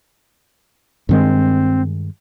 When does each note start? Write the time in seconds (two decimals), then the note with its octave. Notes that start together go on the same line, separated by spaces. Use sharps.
1.09 G2 D#3 G#3 C4